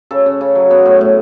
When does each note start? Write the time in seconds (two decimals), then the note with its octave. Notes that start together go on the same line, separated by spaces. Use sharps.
0.11 C#3 A4
0.26 C#3
0.41 C#3
0.55 F#3
0.71 B3
0.86 A2
1.01 A2